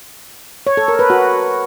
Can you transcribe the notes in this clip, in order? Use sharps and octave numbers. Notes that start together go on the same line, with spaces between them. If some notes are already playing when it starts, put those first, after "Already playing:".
C#5
A4
A#4
B4
F#4